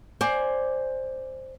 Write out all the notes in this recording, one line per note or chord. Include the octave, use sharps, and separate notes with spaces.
C5 D5 G#5